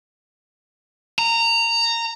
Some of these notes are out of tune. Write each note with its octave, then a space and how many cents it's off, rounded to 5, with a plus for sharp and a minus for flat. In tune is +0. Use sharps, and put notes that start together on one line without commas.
A#5 -15